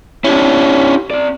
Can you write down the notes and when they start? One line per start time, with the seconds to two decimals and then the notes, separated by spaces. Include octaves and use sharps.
0.24 C#4 D4 E4 G4
1.11 C4 D5